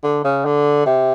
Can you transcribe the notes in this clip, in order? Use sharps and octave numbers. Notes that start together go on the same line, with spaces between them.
D3
C#3
D3
C3